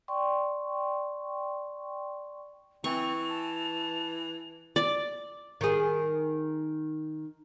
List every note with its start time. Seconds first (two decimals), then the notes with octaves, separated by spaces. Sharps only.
0.08 D5 G5 C6 C#6
2.84 E3 C4 C#6 F7
3.30 A5
4.76 D5
5.61 D#3 G#4